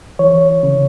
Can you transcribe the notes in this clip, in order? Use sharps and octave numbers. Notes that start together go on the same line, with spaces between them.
E3 C#5
C#3